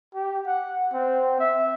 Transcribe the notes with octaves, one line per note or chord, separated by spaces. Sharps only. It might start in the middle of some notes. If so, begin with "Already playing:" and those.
G4
F#5
C4
E5